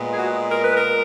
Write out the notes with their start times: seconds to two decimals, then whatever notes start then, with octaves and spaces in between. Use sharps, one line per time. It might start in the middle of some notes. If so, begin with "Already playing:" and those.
Already playing: A#2 G#3 B3
0.12 G#4
0.17 F#4
0.51 A#4
0.63 B4
0.76 A#4